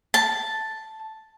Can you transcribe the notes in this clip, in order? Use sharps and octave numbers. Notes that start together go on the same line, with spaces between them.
A5